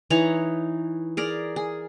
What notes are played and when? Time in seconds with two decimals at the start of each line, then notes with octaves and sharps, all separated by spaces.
0.10 E3 D#4 C#5 A#5
1.17 G#4 A#4 D5
1.56 G#4